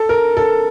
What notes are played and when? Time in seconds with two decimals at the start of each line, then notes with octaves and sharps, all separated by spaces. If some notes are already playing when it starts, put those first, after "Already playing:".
Already playing: A4
0.09 A#4
0.37 A4